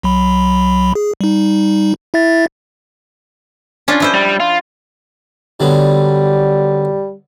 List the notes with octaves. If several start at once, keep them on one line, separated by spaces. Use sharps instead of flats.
B1 F#3 B5
G#4
G3 D#4
E4 E5 A6
C#4 D4 F4
F3 E4 C5
G3
F4
D3 F#3 G3 B3